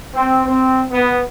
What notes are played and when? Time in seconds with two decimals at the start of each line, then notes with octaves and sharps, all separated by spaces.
0.14 C4
0.46 C4
0.91 B3